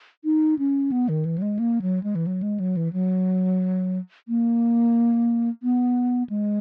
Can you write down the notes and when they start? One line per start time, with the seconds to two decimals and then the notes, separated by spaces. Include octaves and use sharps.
0.24 D#4
0.59 C#4
0.92 B3
1.09 D#3
1.25 E3
1.38 F#3
1.42 G#3
1.59 A#3
1.82 F#3
2.03 G#3
2.15 E3
2.27 F#3
2.43 G#3
2.60 F#3
2.77 E3
2.93 F#3
4.28 A#3
5.63 B3
6.30 G#3